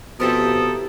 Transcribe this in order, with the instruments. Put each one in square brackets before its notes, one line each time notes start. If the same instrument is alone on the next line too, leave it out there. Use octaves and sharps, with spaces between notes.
[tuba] B2 [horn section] F3 C4 A4 [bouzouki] E4 G4 A#4 [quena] D#6